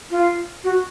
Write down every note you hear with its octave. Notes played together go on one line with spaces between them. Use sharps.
F4
F#4